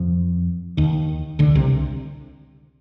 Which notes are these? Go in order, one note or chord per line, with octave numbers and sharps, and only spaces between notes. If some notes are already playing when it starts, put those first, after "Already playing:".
Already playing: F2 F3
D#2 D#3
D2 D3
C2 C3